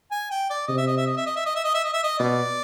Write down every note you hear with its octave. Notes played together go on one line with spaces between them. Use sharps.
G#5
G5
D5
C3 D#5
E5
D#5
E5
D#5
E5
D#5
E5
D#5
E5
D#5
E5
D#5
E5
D#5
B2 D5